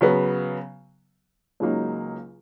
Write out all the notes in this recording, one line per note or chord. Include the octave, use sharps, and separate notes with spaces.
C#3 F#3 B3
C#2 C#3 F#3 A#3 D#4